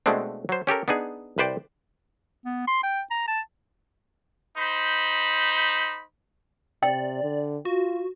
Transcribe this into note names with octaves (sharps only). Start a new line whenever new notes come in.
B2 G#3 A3 C4 D4
F#3 C5
C#4 G4 A4 A#4
B3 D4 D#4 G#4
C2 B4 C5 D5 G5
B3
C6
G5
A#5
A5
D#4 C5 B5
C3 D5 G5
D3
F4 F#4